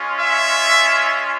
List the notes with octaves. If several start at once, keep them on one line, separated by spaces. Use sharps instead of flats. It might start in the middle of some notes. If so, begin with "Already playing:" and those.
Already playing: G#3 C#4 F4
E5